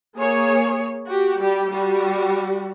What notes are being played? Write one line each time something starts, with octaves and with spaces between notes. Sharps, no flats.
A#3 G#4 C#5
F#4 G4
G3 G4
G3 F#4